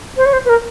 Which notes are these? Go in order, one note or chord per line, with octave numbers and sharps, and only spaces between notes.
C5
C#5
C5
B4
A#4